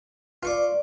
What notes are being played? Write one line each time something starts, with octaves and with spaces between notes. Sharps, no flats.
F4 B4 D5 C#6 D6